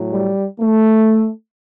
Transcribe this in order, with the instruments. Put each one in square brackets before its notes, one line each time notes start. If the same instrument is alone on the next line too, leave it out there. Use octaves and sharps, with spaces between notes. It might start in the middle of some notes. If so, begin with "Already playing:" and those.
Already playing: [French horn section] A2 F#3
G3
A3